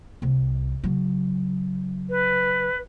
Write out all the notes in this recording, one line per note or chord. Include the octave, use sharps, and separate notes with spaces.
C2 C3
C#3 F#3
B4